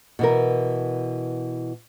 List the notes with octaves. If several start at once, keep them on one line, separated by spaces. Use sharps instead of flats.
B2 E3 A#4